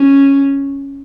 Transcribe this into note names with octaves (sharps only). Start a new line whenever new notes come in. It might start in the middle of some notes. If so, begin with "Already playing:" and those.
Already playing: C#4